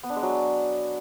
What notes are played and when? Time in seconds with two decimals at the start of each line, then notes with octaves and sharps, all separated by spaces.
0.03 B3
0.10 D4
0.16 G#3
0.23 F#3